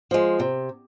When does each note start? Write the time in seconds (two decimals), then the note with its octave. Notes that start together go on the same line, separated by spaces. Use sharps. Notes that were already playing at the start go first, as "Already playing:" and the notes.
0.11 F3 G#3
0.40 C3